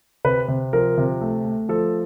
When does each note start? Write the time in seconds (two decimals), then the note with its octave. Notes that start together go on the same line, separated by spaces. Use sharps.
0.24 C3 B4
0.48 C3
0.73 F3 A#4
0.98 C3
1.21 A3
1.45 A3
1.69 F3 A4